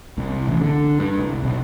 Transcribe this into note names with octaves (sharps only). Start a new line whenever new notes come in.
C2
A1
D3
G2
C2
B1